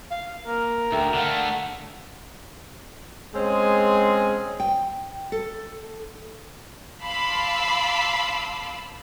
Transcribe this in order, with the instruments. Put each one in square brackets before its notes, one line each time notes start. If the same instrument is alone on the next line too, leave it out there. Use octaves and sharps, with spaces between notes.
[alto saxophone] F5
[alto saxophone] A#3 [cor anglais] A#4
[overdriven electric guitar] D2 [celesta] A4 G5 [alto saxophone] E5
[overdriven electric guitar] D3 A3 [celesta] F5 F#5
[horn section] G#3 C4 C#4 G#4
[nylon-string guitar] G5
A4
[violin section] F5 A5 B5 C6 D6 E6